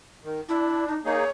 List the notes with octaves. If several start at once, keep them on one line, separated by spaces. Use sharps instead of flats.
D#3
D4 E4
D#4
A#3 D#4 G#4 C#5